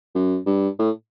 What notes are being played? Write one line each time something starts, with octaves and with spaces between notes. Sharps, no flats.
F#2
G2
A2